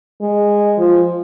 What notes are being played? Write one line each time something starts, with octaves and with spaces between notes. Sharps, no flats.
G#3
F3